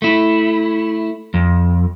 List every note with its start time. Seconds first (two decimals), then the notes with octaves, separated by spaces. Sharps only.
0.02 A3 E4
1.34 F2